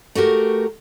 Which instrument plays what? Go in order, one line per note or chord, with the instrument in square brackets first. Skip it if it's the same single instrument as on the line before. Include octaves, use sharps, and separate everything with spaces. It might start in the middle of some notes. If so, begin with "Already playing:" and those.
[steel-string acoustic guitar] A3 F#4 G4 A#4